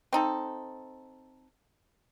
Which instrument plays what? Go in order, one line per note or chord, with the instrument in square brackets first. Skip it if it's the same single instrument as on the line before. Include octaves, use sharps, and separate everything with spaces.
[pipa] C4 D#4 A4